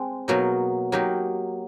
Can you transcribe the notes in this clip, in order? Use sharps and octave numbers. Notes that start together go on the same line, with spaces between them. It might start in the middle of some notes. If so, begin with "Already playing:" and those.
Already playing: G#3 C4
B2 F#3 A#3 D#4
F#3 A#3 D#4 G4